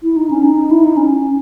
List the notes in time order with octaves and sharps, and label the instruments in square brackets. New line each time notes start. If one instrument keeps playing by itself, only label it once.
[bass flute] E4
D#4
C#4
D#4
E4
D#4
C#4